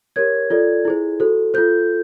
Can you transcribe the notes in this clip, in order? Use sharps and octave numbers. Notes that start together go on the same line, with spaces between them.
G4 A#4 C#5 G#6
F4 A4 D5
E4 G#4 C5
F#4 A4 C5
F4 A4 C5 G6